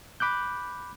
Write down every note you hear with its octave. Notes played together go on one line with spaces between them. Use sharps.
B5 D6 F#6 G6